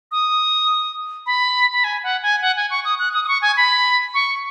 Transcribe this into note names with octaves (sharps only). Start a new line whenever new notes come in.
D#6
B5
B5
G#5
F#5
G#5
F#5
G#5
C#6
D#6
F#6
D#6
D#6
C#6
G#5
B5
C#6